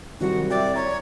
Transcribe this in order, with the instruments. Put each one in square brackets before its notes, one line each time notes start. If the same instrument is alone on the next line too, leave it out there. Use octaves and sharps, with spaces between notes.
[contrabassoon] C2 [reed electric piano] D#3 F#3 [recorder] F#4
[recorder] D5 [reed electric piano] E5 G5
[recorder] C#5 [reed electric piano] A#5